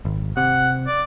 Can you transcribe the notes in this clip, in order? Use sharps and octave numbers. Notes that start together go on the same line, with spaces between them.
G#1
C3 F#5
D5